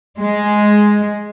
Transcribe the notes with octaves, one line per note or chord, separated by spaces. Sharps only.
G#3